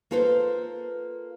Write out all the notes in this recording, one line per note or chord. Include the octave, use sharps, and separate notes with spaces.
A#3 F4 A4 B4 C5